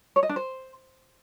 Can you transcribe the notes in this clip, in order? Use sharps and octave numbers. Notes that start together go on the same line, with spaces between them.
C#5
D#5
D4
C5